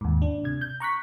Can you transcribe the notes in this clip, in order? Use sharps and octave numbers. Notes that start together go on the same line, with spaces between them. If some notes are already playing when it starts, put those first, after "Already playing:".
D#2 G#2
D4
C3 G#6
G6
A#5 C#6 F#6 B6